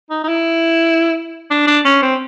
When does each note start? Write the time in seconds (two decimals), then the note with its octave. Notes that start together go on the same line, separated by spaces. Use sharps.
0.10 D#4
0.24 D#4
0.28 E4
1.51 D4
1.67 D4
1.85 C#4
2.03 C4